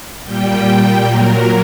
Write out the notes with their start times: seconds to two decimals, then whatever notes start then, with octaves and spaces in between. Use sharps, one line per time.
0.23 A#2 G3 G5
1.03 A#2 F#3 A#4